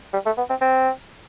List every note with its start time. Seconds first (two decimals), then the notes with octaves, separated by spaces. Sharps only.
0.13 G3
0.26 A3
0.38 B3
0.50 C4
0.61 C4